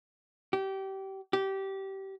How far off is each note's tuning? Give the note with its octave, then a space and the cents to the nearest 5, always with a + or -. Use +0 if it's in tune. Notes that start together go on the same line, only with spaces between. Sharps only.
G4 -25
G4 -20